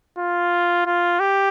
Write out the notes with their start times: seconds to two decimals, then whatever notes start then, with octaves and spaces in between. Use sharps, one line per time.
0.19 F4
0.86 F4
1.20 G4